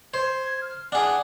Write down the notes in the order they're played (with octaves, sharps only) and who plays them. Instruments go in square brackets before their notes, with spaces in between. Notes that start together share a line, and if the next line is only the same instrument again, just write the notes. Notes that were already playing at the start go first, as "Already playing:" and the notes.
[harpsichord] C5 [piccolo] G#6
[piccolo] F6
[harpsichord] D4 G#4 [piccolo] F#5